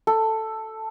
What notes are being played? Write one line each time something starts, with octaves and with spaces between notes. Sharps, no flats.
A4